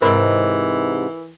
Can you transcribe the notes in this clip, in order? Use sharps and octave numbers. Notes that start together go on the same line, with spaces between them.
G#2 C3 E3 C4 A#4 B4 B5